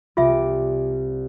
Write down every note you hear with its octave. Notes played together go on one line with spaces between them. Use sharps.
C2 F4 D5 E5